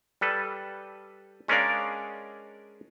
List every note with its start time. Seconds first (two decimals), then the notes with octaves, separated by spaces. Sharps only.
0.21 G3 A4 B4
1.48 G#3 C#4 D4 A#4 D5 F5